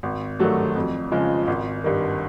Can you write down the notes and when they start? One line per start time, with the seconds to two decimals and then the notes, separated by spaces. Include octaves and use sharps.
0.03 G#1
0.39 G2 D#3 F#3 A3
0.76 F2
1.12 C#3 F3 G#3
1.47 G#1
1.84 G2 D#3